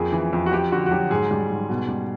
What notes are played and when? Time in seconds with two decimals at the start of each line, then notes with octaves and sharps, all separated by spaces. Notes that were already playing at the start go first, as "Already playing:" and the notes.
Already playing: F2 A#3 G#4
0.12 E3
0.33 F2
0.46 F#4
0.52 F2 G4
0.72 D3 F#4
0.86 F#4
0.91 F#3 G4
1.10 G#2 G#4
1.31 G3
1.50 G#2
1.69 B2
1.88 G3